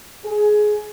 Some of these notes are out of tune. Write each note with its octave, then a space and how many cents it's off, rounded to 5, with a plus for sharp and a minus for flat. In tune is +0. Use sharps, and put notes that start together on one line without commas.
G#4 +15